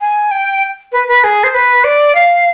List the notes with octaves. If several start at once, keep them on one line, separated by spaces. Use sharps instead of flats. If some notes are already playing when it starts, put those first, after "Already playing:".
G#5
G5
B4
B4
G#4
C5
B4
D5
F5